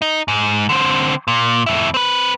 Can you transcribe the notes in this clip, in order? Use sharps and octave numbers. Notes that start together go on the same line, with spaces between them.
D#4
G#2
D3 C4
A#2
F2 E4
C4 B4